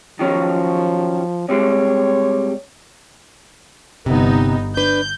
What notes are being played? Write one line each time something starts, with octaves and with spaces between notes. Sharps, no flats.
D#3 F3 F#3 C#4
C3 G3 G#3 C#5
G1 C3 B3 D#4
D4 B4 G6